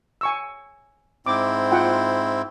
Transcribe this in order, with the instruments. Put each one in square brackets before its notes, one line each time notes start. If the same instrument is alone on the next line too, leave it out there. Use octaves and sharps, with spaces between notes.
[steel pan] G#5 C#6 E6
[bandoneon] G#2 C4 E4 [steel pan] D6
[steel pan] F4 F#5 G5